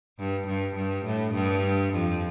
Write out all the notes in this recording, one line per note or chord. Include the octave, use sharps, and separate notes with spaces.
G2
G2
G2
A2
G2
F2